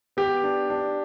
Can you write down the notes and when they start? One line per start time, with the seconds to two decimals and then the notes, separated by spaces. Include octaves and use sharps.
0.17 B3 G4
0.44 D4
0.70 D4